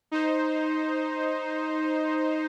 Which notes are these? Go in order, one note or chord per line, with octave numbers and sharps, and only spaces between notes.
D#4 C5